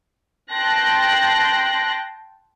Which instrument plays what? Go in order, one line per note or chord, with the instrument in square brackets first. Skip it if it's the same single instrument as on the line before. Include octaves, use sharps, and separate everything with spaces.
[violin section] G5 A5 C6 F#6 A#6